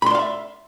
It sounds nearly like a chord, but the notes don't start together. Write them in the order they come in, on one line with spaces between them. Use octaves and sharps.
B5 C6 D5 F5 E5